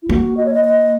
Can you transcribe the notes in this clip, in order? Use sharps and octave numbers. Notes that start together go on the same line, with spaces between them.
E4
A#3 F#4
D#5
C#5
D#5
D#5